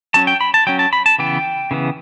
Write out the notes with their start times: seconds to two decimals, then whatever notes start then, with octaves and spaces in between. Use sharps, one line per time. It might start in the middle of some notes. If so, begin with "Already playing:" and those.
0.14 F#3 C#4 A5
0.27 G5
0.41 B5
0.54 A5
0.67 F#3 C#4 G5
0.79 A5
0.93 B5
1.06 A5
1.19 C#3 E3 B3 G5
1.71 C#3 E3 B3